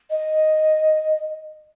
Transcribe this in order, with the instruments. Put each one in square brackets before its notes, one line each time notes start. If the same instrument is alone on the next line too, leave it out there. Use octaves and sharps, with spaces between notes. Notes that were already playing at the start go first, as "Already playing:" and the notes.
[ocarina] D#5